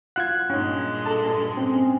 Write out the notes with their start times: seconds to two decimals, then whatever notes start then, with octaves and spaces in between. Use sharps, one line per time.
0.16 F4 F#5 F#6 G#6
0.50 G2 A#2 G#3 C#4 D#4
1.06 A4 A5 A#5
1.57 C4 C#4